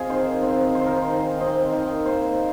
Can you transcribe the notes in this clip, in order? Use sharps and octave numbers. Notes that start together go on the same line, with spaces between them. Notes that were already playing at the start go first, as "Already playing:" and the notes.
Already playing: C4 F4 G#4 D#5
D#3 C5
C4
D#3 C5
A#4
C5
D#3
C4 D#5
D#3
A#3 C5